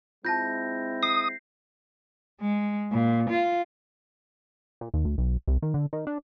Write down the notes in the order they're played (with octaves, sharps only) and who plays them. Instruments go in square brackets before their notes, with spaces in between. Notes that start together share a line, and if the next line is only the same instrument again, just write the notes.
[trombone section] G#3 C4 E4 [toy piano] F4 A5 [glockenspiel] G6 A#6
[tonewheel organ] D#6 [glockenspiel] C7
[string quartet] G#3
A#2
F4
[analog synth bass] A#2
D#2
D2
B1
C2
D#3
D3
D#3
D4